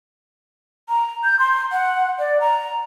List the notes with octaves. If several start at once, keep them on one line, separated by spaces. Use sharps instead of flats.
A#5
G6
C6
F#5
D5
A#5